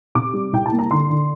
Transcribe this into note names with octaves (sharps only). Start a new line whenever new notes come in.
C3 D6
G3
C2 G5
A5
A#3
A#5
D3 C6
D3